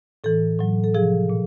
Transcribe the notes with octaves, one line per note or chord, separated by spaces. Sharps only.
A2 E3 A4
A2 F#3
A4
C3 F3 G#4
A#2